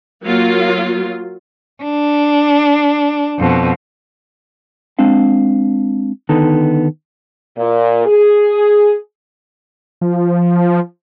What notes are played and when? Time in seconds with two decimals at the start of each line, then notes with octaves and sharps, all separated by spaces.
0.24 F#3 A#3 F4
1.83 D4
3.39 F2 B2
4.99 G#3 C4 D4 F5
6.29 D3 D#3 B3 D#4 A4
7.57 A#2
8.06 G#4
10.01 F3